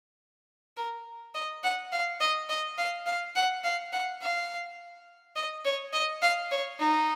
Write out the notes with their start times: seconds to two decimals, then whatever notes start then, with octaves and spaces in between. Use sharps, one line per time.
0.77 A#4
1.35 D#5
1.63 F#5
1.92 F5
2.20 D#5
2.49 D#5
2.78 F5
3.06 F5
3.35 F#5
3.64 F5
3.93 F#5
4.21 F5
5.36 D#5
5.65 C#5
5.93 D#5
6.22 F5
6.51 C#5
6.79 D#4